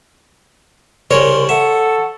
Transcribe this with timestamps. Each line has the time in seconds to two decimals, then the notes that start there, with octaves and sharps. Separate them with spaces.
1.11 C2 C#3 A#4 C#5 C6
1.49 A4 E5 F#5